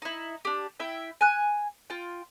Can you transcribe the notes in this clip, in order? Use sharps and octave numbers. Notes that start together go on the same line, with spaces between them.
D#4 E4
D4 G4
E4 E5 G5
G#5 F#6
F4 G5